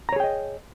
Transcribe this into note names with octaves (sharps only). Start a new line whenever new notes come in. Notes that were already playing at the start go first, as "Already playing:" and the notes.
G#4 C#5 D#5 G5 A#5